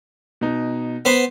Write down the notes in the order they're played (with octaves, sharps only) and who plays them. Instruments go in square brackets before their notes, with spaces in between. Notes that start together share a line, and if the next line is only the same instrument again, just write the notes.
[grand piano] B2 D#4
[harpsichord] B3 C5